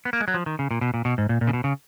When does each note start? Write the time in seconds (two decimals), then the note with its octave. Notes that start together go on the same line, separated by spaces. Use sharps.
0.05 B3
0.13 A#3
0.21 G#3
0.28 F#3
0.34 F3
0.46 D#3
0.59 C#3
0.71 A#2
0.81 B2
0.94 A#2
1.05 B2
1.18 G#2
1.29 A#2
1.41 A#2
1.47 C#3
1.53 B2
1.64 C#3